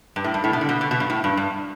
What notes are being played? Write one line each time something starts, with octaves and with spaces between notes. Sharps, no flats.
G2
A2
G2
A2
B2
D3
B2
B2
B2
G2
A2
G2
G2